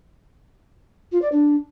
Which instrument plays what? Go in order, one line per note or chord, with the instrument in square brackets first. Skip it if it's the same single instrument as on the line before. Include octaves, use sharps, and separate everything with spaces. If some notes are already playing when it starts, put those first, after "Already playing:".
[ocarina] F4
D5
D4